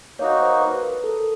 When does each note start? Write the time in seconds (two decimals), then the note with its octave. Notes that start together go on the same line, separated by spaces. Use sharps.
0.19 A#3 D#4 F#4 C#5
0.40 C5
0.61 B4
0.83 A#4
1.04 A4